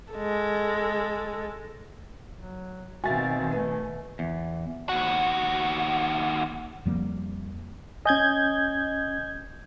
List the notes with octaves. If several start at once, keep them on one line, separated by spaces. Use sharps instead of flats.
G#3 A4
F#3
B2 D#3 C4 F#4 E5 F5 G#5 A6
A3 B4
E2
D#2 F#4
F2 F3 G3 A#3
C#4 D#5 G#5 G6 G#6